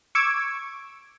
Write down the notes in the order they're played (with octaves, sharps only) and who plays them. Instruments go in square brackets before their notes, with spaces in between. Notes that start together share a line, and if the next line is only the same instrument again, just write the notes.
[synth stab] C#6 D6 E6 G#6